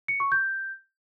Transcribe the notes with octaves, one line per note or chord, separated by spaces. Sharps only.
C#7
C#6
G6